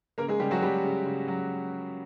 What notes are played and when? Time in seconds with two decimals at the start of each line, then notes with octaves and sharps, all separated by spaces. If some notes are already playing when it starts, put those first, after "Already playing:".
0.18 C#3 A#3 A#4
0.28 G#3 G#4
0.39 C#3 G3 G4
0.51 F#3 F#4
0.62 C#3 G3 G4
0.83 C#3
1.06 C#3
1.28 F#3